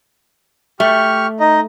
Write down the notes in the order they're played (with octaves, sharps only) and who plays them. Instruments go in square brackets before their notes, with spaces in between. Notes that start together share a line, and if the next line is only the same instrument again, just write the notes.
[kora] A3 [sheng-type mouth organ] G4 C#6 F6
[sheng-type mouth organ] D#4 D#5